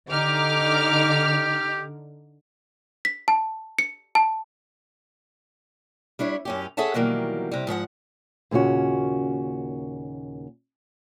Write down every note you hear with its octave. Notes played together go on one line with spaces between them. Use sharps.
D3 D#4 G4 D6 F6
B6
A5
C#7
A5
G3 D4 E4 C#5
F#2 C#4 G4
G#4 A4 C#5 E5 F#5 A5
B2 D#3 E3 F#3 G3 A#3
C3 G3
G#2 F3 C5 F#5
D#2 A#2 C#3 C#4 F#4